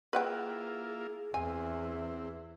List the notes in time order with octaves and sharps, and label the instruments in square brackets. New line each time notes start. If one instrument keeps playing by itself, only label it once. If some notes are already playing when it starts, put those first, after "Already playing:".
[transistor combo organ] A#3 E4 F4 [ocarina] G#4 [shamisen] B4 F#5 G5
[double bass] E2 E4 [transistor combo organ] C4 [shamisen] G#5